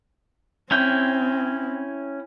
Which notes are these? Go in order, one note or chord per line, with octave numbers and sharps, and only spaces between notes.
C4 C#4 E4 G5